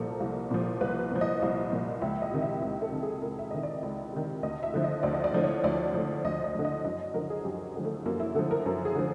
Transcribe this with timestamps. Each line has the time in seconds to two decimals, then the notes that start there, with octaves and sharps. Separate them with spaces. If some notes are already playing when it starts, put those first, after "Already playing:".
Already playing: C2 A#2 F3 A4 A#4
0.20 C2
0.51 A#2 F3
0.81 C2 B4
1.12 A#2 F3
1.21 D#5
1.42 C2
1.72 A#2 F3
2.02 C#2 E5
2.22 D#5
2.32 C3 D#3
2.42 E5
2.62 C#2
2.82 A4
2.92 C3 D#3
3.03 G#4
3.22 C#2 A#4
3.39 E5
3.51 C3 D#3 D#5
3.63 D5
3.83 C#2
4.13 C3 D#3
4.43 D2 D#5
4.63 E5
4.74 D3 F3
4.84 D#5
5.03 D2 D5
5.14 D#5
5.24 D5
5.34 D3 F3
5.43 C#5
5.64 D2 D5
5.94 D3 F3
6.24 D2 D#5
6.44 D#5
6.54 D3 F3
6.65 D#5
6.84 F#2 D#5
7.14 D3 F3 A#4
7.30 G#4
7.45 F#2 G4
7.76 D3 F3
7.85 A3
8.06 F#2 A#3
8.20 E4
8.35 D3 F3 A4
8.51 A#4
8.66 F#2 A#4
8.85 G#4
8.95 D3 F3